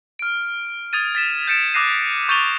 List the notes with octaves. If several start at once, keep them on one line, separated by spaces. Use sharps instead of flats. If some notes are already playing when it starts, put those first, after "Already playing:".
F6 D7
D#6 G#6 A6 D#7
A6 B6 E7
G6 A6 C#7 D7 E7
D6 D#6 F#6 A#6 C7 D#7
C#6 G6 A6 D#7 F7 G7